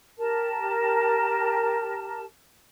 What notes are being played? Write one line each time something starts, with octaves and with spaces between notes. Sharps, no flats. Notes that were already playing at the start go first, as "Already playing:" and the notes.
G4 A#4 A5